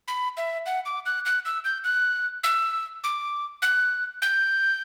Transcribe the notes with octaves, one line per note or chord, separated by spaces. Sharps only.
B5
E5
F#5
D6
F#6
F#6
E6
G6
F#6
E6
D6
F#6
G6